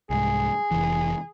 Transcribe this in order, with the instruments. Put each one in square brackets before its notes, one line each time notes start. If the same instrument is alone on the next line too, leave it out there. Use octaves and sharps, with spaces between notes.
[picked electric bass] C2 G#2 [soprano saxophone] G#4
[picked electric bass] F1 A#1 E3